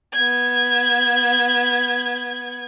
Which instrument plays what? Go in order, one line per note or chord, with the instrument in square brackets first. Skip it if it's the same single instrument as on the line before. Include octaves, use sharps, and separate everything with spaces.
[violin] B3 G#6